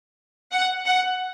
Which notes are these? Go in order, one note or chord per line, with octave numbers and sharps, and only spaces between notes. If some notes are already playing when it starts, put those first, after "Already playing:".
F#5
F#5